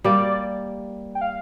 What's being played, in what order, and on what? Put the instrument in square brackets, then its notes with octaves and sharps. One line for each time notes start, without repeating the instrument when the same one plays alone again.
[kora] G3 A#3 [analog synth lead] D5
[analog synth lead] G5
F5